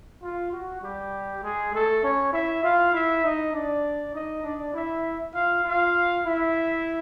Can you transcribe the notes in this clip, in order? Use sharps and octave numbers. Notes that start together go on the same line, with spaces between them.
F4
F#4
G3 G4
G#3 G#4
A3 A4
C#4 C#5
E4 E5
F4 F5
E4 E5
D#4 D#5
D4 D5
D#4 D#5
D4 D5
E4 E5
F4 F5
F4 F5
E4 E5